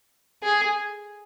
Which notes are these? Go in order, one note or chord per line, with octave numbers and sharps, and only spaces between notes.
G#4